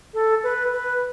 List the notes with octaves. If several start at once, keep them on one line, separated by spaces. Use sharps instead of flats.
A4
B4
B4